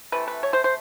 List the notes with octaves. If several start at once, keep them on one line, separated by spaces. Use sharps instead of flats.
C3 E3 A3 B4
B4
C#5
C5
C5